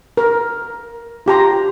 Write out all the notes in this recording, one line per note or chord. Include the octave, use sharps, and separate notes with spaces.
A#4
F4 G4 A#5 C6